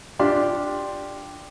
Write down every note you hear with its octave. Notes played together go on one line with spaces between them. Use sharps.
D4 F4 G4 D5 C6